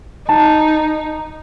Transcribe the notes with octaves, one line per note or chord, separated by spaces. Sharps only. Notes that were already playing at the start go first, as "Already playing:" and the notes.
D#4 A5